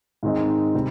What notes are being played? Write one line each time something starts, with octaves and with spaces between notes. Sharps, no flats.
G#2 D#3 G#3 C4 D#4
C3 G3 C4